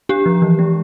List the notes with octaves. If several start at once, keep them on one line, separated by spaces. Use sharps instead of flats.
D4 G4
F3
E3
G#3